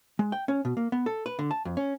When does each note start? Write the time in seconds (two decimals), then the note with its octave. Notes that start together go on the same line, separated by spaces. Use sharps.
0.19 G#3
0.32 G5
0.48 C#4
0.65 B2
0.77 A#3
0.92 B3
1.06 A4
1.26 B4
1.39 D3
1.51 A5
1.65 F2
1.77 C#4